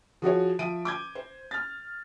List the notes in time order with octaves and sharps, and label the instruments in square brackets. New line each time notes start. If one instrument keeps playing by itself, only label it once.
[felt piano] F3 F#4 G#4 C#5
F3 E5 D7 D#7
D6 G6 G#6
C5
F6 A6